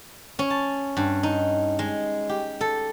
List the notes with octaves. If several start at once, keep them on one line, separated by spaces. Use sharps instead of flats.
C#4
A5
G2
D#4
G#3
G4
A4